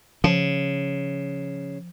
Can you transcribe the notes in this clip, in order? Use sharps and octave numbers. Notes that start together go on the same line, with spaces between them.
C#3 F3